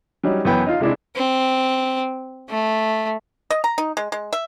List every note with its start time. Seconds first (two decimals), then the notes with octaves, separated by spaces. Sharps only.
0.23 F#3 G3 C#4 D#4
0.45 F#2 E3 B3 G5 B5
0.66 D#4 F4 F5
0.80 C3 G#3 D4 E4
1.16 C4
2.50 A3
3.50 D#5
3.64 A#5
3.78 D#4
3.97 G#3
4.12 G#3
4.33 E5